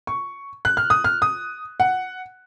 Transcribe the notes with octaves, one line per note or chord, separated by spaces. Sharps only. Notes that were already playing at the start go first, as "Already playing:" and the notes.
C#6
F#6
F6
D#6
F6
D#6
F#5